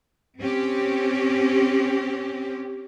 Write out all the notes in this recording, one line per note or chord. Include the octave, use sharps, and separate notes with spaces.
C4 C#4 G4